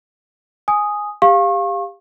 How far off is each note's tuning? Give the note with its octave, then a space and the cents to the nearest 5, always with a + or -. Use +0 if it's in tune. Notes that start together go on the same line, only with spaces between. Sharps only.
G#5 +0 D#6 +0
G4 +25 F5 +0 C#6 -35